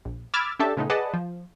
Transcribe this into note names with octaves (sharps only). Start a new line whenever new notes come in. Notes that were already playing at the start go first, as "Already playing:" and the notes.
A#1
B5 D6 E6 F6 G#6 A6
C#4 D4 G4 A4 E5 A5
A#2 C#3 G#3 A3 B3 D#4
G#4 B4 D5 D#5 F#5 A5
F3